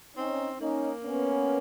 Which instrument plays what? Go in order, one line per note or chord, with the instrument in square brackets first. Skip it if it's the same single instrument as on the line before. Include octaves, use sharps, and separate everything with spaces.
[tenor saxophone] C4 [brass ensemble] C#4 D#4
[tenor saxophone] A#3 [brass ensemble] C#4 D#4
[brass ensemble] B3 C#4